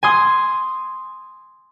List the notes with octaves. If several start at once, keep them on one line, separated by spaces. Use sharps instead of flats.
G#5 C6 D#6